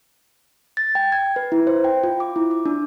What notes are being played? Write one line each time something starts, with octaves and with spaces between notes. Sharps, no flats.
A6
G5
G#6
B4
E4
C5
G5
F4
D6
E4
D6
D4